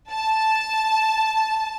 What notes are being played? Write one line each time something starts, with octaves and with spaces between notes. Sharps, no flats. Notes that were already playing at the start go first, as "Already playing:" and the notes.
A5